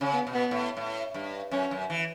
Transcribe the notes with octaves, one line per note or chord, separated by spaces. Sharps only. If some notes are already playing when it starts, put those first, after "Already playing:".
C#3 C#4
B3
B2
B3
A2
A2
G2
F#2 C#4
F#2
E3